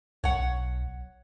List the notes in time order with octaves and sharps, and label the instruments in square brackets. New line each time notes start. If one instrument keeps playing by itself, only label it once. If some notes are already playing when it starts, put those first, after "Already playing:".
[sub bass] B1 [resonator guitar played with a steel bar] C#5 F#5